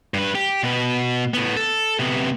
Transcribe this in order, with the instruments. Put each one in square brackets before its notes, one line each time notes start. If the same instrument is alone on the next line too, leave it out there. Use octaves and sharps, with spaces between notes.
[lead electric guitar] G2 B4
G4
B2 B4
A2 B3
A4
C3 B3